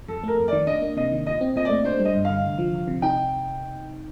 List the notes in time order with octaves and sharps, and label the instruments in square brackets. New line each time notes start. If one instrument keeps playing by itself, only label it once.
[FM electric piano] F2 [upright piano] A4
[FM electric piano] A3 [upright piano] A#4
[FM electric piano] F2
[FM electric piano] D#3 [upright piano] D5
[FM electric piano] D4 [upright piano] D#5
[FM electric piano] A#3
[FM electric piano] C3 [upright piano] D#5
[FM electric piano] D#3
[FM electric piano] A#2 [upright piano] D#5
[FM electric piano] C4
[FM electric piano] A#2 [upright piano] D#5
[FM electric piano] A3 [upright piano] D5
[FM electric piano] D4 [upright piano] C5
[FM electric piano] G3
[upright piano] D#5
[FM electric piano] G2
[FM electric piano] D3 [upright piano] F5
[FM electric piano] C2
F3
C2
C3
[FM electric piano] D#4 [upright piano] G5